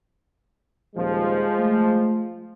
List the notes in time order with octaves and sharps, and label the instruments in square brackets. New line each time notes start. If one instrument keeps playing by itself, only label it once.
[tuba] D#1 [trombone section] F3 [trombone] G#3
[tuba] A3